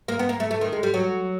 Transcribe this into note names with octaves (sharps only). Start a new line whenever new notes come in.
A#3
B3
A#3
A3
A3
D#3
G#3
G3
F#3